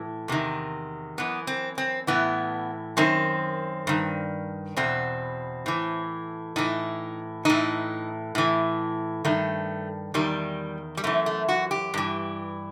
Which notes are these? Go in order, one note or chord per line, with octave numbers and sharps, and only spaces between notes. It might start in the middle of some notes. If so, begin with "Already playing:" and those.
Already playing: A2 E3
E2 C3 D#3
F#2 E3 B3
C4
C4
A2 E3 B3
F#2 D#3 C4
G2 D#3
E2 B2 C4
A2 E3
A2 E3 D#4
A2 E3 D#4
A2 E3
G2 D#3 A3
E2 D#3 G3
G3
F#2 E3 A3
A3
F#4
G4
G2 E3